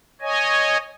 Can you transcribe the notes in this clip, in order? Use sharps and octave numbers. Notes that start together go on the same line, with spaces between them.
C#5 D#5 G#5